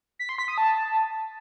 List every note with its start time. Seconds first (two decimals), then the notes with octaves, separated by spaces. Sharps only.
0.19 B6
0.29 C6
0.39 B6
0.48 D#6
0.58 A5